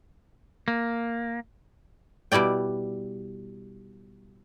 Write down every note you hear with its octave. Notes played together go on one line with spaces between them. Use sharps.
A#3
B2 G3 E4 D5 G5